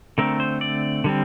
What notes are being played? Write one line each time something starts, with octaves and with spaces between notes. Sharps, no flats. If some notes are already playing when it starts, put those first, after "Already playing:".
D3 A3 C4 A#4
C5
D5
D3 G3 C4